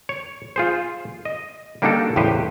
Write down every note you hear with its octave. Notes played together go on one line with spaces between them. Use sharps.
C#5
F4 G#4 C5
D#5
G3 A#3 D4 D#4 F#4 A4
E2 A2 C#3 G4 B4 C5